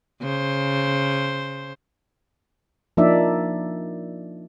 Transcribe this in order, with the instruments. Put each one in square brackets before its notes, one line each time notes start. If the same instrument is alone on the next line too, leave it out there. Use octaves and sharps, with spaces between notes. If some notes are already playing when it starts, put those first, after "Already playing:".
[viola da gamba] C#3 C5
[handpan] F3 A#3 D4 D#4 D5 E5